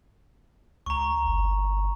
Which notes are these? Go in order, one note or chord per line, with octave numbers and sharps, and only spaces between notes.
C#2 A#5 C#6
G1